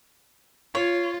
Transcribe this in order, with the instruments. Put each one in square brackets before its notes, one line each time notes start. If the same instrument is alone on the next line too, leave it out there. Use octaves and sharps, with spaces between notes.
[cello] F4 [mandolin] C#5